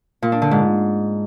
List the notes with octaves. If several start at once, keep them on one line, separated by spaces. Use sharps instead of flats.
A#2
D4
D3
G#2